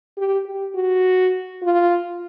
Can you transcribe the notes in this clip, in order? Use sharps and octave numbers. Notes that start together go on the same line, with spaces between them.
G4
G4
F#4
F4